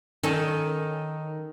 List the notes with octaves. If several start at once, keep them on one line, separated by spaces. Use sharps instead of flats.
D#3 C#4 A4